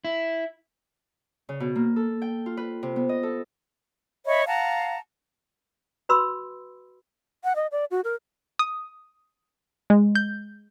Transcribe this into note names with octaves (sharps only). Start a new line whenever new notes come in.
E4
C#3
B2
A#3
A4
G5
F4
B4
C3
B3
D#5
A4
C#5 D#5 E5 B5
F5 F#5 A5 A#5
F#4 B4 B5 C6 E6
F#5
D#5
D5
F#4
A#4
D#6
G#3
G6